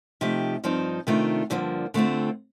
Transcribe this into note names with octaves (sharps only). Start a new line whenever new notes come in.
C3 F3 A3 D#4 G4
G2 F3 C4 D#4
C3 D#3 A3 D4 F4
G2 D3 F3 A#3
D3 A3 C4 F4